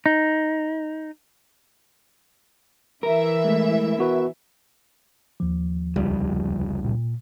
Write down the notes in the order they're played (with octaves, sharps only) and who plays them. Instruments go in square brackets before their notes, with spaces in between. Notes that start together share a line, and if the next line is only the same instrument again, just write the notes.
[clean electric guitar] D#4
[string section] E3 E5 [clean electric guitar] A#4
[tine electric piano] G#3 A3
B3 F#4 B4
D#2 F3
[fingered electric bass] F1 C#2 G3
[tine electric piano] A#2